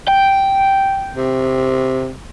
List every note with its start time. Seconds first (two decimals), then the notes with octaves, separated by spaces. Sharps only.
0.08 G5
1.17 C3